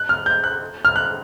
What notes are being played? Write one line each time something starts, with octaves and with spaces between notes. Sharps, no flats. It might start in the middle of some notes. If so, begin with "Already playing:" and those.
Already playing: F#6
F6
G6
F#6
F6
F#6